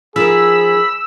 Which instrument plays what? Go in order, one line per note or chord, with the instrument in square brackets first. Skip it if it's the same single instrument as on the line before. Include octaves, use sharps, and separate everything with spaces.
[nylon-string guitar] F3 D#4 A#4 [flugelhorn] G#4 [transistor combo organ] B5 [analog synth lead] E6